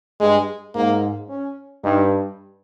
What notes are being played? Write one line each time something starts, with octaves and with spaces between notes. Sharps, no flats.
G2 G#3
G#2 A#3
C#4
G2 D#4